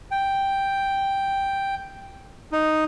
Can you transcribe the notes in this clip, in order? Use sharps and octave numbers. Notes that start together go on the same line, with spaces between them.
G5
D#4